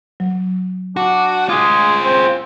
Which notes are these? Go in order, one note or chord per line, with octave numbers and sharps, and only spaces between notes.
F#3
D4 F#4
G#3 F4 G#4
C4